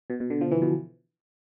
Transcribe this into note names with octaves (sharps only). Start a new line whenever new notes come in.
B2
B2
D3
F3
E3
B2